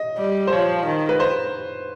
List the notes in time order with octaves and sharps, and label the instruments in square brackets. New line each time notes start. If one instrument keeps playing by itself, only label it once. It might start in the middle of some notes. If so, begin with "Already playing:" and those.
Already playing: [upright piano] D#5
[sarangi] G3
[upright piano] C5
[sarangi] F3 [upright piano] C#5
[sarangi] D#3
[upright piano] B4
C5